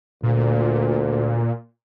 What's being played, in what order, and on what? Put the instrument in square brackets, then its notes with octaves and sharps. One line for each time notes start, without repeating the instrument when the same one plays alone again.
[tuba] D2 [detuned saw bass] A#2